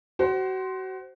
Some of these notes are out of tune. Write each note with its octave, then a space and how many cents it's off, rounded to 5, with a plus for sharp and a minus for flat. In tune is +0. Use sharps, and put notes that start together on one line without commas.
F#4 +30 C5 +0